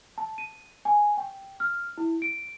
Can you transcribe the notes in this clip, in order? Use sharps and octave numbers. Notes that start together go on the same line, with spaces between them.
A5
D#7
G#5
G5
F6
E4
D7